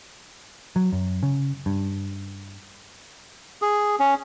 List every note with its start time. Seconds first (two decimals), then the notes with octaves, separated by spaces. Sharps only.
0.76 F#3
0.93 F#2
1.23 C#3
1.66 G2
3.62 G#4
3.99 C#4